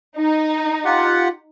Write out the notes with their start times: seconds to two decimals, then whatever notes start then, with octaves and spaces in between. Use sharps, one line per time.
0.17 D#4
0.85 F4 G4 F#5